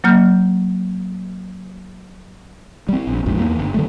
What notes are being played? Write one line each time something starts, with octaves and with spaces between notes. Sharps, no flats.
F#3 A#3 F6 G6
G3 C4
A#1
A#1 F2 G#2
E2 A#3
G1
D3 G3 A3